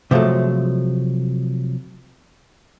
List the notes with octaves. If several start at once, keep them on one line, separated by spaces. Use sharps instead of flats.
C3 F3 F#3 G#3 A3